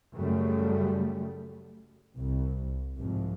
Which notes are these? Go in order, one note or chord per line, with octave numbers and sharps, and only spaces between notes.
F#2 C#3 G3 A3
C2
C2 F2 G#2